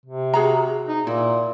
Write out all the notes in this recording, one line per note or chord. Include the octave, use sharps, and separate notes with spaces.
C3
F#4 G#4 A#5
D#4
A#2 E4